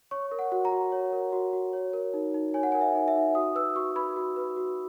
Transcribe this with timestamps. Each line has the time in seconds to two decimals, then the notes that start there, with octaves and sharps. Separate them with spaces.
0.11 C#5 C#6
0.31 A#4
0.39 F#5
0.52 F#4
0.65 A#5
0.72 F#4
0.92 C#5
1.13 A#4
1.33 F#4
1.53 F#4
1.73 C#5
1.93 A#4
2.14 D#4
2.34 D#4
2.54 C#5 G#5
2.63 F#5
2.72 A#4 G#5
2.81 E5
2.95 D#4
3.08 E5
3.15 D#4
3.35 F#4 D#6
3.55 B4 E6
3.75 F#4 C#6
3.96 B4 B5
4.16 F#4
4.36 B4
4.57 F#4